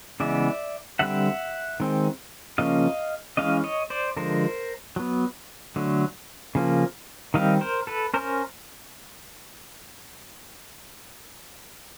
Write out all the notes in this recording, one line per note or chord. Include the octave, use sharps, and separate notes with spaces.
C#3 E3 G#3 B3 D5 E5
D3 G3 C4 E5 F#5
D#3 G#3 C4
C#3 F3 A#3 C#4 D#5 F5
E3 G#3 C#4 D#5 F5
C#5 D#5
C5 D5
D3 F3 G#3 A#4 C5
F#3 B3
D3 F#3 A3
C#3 F3 A#3 C#4
D#3 G3 C4 D#5 F5
A#4 C5
A4 B4
C#4 A#4 C5